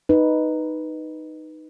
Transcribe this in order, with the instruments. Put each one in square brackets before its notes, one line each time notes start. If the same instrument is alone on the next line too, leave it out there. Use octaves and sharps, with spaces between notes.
[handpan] D#4 B4